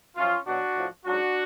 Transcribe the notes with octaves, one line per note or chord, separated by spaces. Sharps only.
F#2 F3 C#4 F4
B2 F#3 D4 F#4
A2 F3
G#2 F#3 D4 F#4